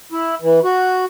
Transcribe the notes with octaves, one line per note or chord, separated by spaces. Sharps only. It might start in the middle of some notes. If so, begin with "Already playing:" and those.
E4
E3
F#4